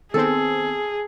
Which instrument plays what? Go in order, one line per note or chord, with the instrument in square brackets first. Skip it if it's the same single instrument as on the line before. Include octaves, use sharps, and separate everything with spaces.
[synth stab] D#3 B3 C4 [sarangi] G#4 [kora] A4